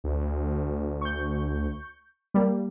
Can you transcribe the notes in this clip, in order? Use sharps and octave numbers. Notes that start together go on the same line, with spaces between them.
D2
C#6 G6
G3 A#3